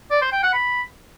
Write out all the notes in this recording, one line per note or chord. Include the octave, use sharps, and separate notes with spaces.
D5
C5
G5
F#5
B5